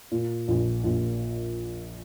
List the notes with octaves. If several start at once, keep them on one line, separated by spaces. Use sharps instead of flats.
A#2
A#1
A#1